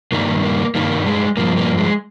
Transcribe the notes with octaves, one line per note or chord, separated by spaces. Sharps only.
G2 D#3 G3 A#3
A#3
G2 D#3 G3 A#3
G#3
G2 F3 A#3
A#3
G#3